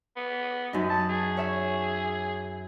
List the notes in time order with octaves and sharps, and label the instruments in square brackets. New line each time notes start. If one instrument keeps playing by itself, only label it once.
[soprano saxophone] B3
[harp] F#2 D#4
[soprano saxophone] A5
G#4
[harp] C#5 E5 G#5